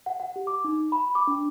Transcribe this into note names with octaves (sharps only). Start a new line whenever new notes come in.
F#5
F#5
G4
D6
D#4
B5
D6
D4